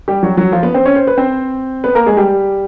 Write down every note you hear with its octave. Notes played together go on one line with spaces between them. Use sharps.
G3 G4
F#3 F#4
F#3 F#4
F3 F4
B3 B4
C4 C5
C#4 C#5
C5
B4
C4 C5
B3 B4
A#3 A#4
G#3 G#4
G3 G4